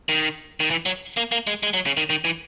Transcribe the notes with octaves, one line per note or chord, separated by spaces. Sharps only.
D#3
D#3
E3
F#3
A#3
A#3
G#3
G#3
F#3
C#3
D#3
D#3
E3